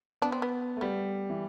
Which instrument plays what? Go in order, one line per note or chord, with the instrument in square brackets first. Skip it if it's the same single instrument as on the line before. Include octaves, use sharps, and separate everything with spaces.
[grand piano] B3 [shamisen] D4
[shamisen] C4
B3
[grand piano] A3
[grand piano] G3 [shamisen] B3
[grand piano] E3